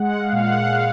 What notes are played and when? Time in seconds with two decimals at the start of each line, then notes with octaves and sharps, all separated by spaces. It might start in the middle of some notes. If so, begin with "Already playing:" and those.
Already playing: G#3 F#5
0.20 F5
0.33 A#2
0.46 F#5
0.72 A#2 F5